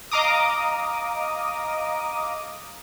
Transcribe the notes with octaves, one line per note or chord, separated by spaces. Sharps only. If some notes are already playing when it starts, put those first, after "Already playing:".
D#5 F5 A#5 D6 D#6